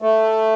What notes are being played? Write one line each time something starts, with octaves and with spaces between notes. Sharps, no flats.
A3